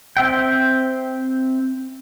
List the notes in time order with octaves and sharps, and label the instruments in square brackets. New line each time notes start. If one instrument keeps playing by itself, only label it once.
[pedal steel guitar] C4 E5 G5